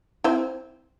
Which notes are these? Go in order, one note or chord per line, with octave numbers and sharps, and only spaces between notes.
C4 E4